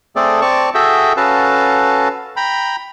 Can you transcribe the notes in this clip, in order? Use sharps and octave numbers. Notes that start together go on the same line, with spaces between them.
A3 C4 G#4 A4 D5
C4 D5 A5 C#6
F#4 G#4 A4 E5 G5
C#4 F#4 A4 B4 F5 A5
G5 A#5 B5